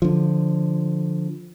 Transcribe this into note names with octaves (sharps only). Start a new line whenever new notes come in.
D3 F3